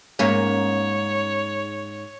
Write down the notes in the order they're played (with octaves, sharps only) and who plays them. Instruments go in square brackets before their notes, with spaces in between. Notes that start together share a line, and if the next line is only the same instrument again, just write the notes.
[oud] G#2 A#3 C#4 [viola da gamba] C#5